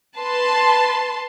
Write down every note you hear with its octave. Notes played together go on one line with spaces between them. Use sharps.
B4 A5 C6